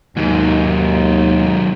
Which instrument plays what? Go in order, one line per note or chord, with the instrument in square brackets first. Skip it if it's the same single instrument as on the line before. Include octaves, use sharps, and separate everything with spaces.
[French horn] D#2 [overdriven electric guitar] G#2 [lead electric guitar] D#3 F#3